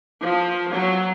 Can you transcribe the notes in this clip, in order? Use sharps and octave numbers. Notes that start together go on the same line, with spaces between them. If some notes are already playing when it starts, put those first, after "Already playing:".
F3
F#3